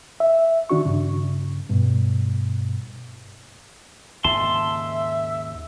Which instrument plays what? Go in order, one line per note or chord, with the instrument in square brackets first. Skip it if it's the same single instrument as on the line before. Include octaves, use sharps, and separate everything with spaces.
[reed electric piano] E5
D#3 D4 F#4 C#6
G2 C#3
G2 B2
[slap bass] D#2 G#2 C#3 [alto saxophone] E5 [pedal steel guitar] A5 C6